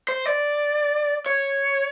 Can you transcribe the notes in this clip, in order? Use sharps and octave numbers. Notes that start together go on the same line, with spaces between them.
C5
D5
C#5